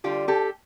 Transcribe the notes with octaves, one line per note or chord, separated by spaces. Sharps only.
D3 G3 F4 G4
G4 A4